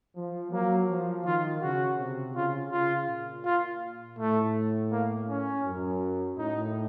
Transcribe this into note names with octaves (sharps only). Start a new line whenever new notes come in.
F3
F#3 A#3
F3
D#3 F4
C#3 F#4
C3
C#3 F4
C#3 F4
A#2
F4
A2 A3
A#3
C#4
F#2
A2 D#4